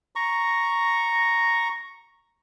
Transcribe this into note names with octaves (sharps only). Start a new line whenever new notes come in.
A#5 C#6